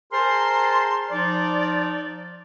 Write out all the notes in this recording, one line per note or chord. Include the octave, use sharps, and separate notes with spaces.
G#4 A#4 C5 A5 A#5 C6
F3 D#4 D5